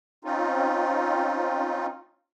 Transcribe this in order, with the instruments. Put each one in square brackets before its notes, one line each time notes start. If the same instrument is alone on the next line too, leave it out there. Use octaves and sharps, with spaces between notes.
[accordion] C4 C#4 D#4 F4